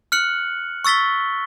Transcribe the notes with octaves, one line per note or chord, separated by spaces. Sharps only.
F6 F#6 C#7 F#7
C#6 E6 A6 B6 G7